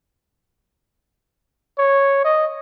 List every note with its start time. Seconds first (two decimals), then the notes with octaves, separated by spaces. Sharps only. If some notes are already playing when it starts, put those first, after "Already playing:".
1.78 C#5
2.24 D#5